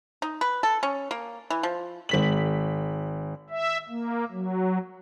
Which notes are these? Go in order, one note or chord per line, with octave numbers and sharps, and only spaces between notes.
D#4
B4
A4
C#4
A#3
E3
F3
G#1 B6 F#7
E5
A#3
F#3